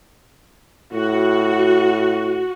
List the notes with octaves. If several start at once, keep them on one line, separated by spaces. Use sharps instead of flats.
A2 F#4